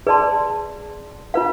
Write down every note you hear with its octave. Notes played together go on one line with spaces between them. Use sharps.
G#4 B4 D5 A5 C6
F4 B4 F5